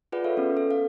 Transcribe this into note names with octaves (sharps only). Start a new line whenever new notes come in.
F4 G#4 B4 D5 F#5
A4 C#5 E5 F5
B3 C#4
A4
F5